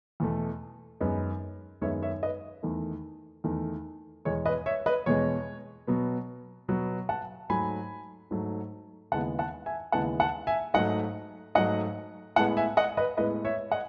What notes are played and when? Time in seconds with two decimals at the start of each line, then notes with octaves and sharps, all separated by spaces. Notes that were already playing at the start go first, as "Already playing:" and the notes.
0.20 E2 B2 A3
1.00 F#2 D#3 G#3 B3
1.82 F#2 D#3 G#3 B3 C#5 E5
2.02 C#5 E5
2.23 B4 D#5
2.63 E2 D#3 A3
3.44 E2 D#3 A3
4.25 E2 B2 G#3 C#5
4.46 B4 D#5
4.66 C#5 E5
4.86 B4 D#5
5.06 E2 B2 G#3 C#5
5.87 B2 F#3 B3
6.68 B2 F#3 B3
7.09 F#5 A5
7.49 G#2 F#3 A3 G#5 B5
8.31 G#2 F#3 A3
9.12 D#2 C#3 E3 G#3 B3 F#5 A5
9.39 F#5 A5
9.66 E5 G#5
9.92 D#2 C#3 E3 G#3 B3 F#5 A5
10.20 F#5 A5
10.47 E5 G#5
10.74 G#2 F#3 A3 D#5 F#5
11.55 G#2 F#3 A3 D#5 F#5
12.36 A2 G#3 B3 F#5 A5
12.57 E5 G#5
12.77 D#5 F#5
12.97 B4 D#5
13.17 A2 G#3 B3 B4 D#5
13.45 C#5 E5
13.72 D#5 F#5